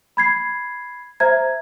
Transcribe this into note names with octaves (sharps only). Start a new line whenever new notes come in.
B5 G#6 C7
C5 E5 A#5 G#6